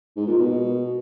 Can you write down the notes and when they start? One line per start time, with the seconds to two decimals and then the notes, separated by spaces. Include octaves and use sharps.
0.16 G#2
0.27 A#2
0.38 B2